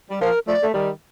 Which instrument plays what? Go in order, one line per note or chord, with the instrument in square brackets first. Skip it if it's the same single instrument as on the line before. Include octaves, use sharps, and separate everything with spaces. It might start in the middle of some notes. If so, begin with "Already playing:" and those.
[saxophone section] G3
[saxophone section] F3 [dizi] A#4
[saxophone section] F3 A3 [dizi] D5
[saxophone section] A3
D#3 G3